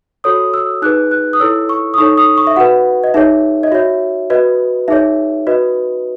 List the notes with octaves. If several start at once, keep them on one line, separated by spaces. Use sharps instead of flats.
F#4 A4 C#5 D#6
E6
D#4 G#4 B4 F#6
F#6
D#6
E4 A4 C#5 E6
C#6
D#6
D#4 A4 C#5 C#6
D#6
C#6
E5
F#4 B4 F#5
D#5
D#4 G#4 C#5 E5
D#5
F#4 C#5 E5
F#4 B4 D#5
D#4 G#4 C#5 E5
F#4 B4 D#5